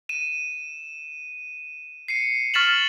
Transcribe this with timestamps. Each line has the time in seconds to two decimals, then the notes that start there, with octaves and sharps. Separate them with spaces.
0.09 D#7 E7
2.08 C7 C#7 D#7
2.54 C#6 F6 A6 B6 E7 F#7